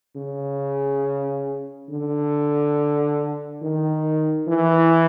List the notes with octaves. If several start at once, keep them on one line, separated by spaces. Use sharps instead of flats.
C#3
D3
D#3
E3